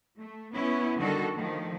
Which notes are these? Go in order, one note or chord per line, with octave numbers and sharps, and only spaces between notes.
A3
B3 C#4 E4
D3 D#3 G3 F#4 A4 A#4
D#3 F3 A3